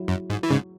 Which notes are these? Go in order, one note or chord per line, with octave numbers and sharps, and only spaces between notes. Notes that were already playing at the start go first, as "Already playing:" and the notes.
Already playing: F#3 E4
F#2
G#2
E3
G#2 C#3